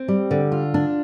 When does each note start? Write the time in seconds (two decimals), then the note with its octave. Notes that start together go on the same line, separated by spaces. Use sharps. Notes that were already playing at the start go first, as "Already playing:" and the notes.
Already playing: C4
0.08 G3
0.31 D3
0.52 F4
0.74 D4